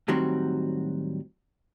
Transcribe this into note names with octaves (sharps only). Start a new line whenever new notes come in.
A2 D#3 F#3 G3 C4 F#4